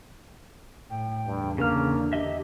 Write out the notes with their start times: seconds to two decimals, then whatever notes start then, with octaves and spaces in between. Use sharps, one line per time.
0.90 A2 G5
1.26 E2 G2 D3
1.58 C#3 A#3 D4 F6
2.13 G4 D#5 E5